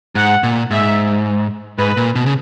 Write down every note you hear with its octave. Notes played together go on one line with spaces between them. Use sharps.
G#2 F#5
A#2
G#2 E5
G#2 B4
A#2
B2
C#3